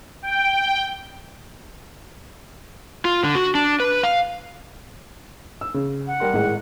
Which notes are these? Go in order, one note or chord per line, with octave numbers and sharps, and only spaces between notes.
G5
F4
D3
F#4
D4
B4
F5
E6
C#3
F#5
G3 A#4 C6
G#1 A2 G#3